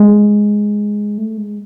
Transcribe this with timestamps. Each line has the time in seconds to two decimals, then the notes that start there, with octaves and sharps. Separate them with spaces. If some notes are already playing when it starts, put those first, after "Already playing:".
Already playing: G#3
1.18 A3
1.37 G#3